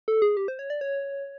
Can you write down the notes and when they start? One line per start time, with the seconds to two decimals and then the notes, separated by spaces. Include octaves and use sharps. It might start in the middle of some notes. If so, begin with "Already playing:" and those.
0.08 A4
0.22 G#4
0.37 G4
0.48 C5
0.59 C#5
0.70 D5
0.81 C#5